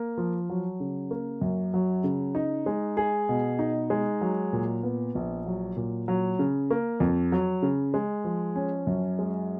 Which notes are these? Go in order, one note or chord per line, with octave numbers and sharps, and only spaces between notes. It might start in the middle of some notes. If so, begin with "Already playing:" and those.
Already playing: A#3
F3
F#3
C#3
A#3
F#2
F#3
C#3
D#4
G#3
G#4
B2
D#4
G#3
F#3
A#2
B3
A#1
F#3
A#2
F#3
C#3
A#3
F2
F#3
C#3
G#3
F3
C#4
F#2
G#3